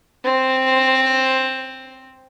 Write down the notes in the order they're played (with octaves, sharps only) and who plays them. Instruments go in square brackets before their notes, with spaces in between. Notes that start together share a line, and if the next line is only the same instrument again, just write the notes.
[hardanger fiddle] C4 C5